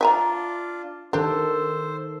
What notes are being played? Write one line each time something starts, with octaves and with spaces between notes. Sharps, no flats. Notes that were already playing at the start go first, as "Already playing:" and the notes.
D4 F4 E5 G#5 A#5
D#3 D4 G4 A4 C5